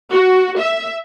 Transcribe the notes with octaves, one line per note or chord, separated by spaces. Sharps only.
F#4
E5